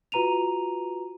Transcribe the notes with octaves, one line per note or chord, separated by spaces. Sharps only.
F4 F#4 B4 A#5 D#7 F7